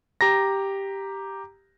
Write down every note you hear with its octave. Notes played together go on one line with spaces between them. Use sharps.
G4 A#5 A#6